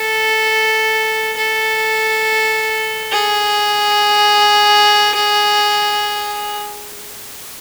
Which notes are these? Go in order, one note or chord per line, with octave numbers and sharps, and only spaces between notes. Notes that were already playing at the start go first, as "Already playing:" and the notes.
Already playing: A4
A4
G#4